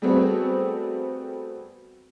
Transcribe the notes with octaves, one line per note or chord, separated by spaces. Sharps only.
G3 A3 B3 C4 F#4 G#4